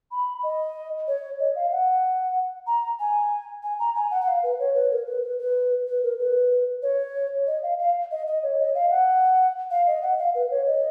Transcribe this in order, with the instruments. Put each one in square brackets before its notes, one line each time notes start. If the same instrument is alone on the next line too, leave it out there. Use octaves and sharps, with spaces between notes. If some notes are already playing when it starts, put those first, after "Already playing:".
[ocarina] B5
D#5
C#5
D#5
F5
F#5
A#5
G#5
G#5
A#5
G#5
F#5
F#5
F5
B4
C#5
B4
A#4
B4
B4
B4
B4
A#4
B4
C#5
D#5
F5
F5
D#5
D#5
C#5
D#5
F5
F#5
F5
D#5
F#5
F5
B4
C#5
D#5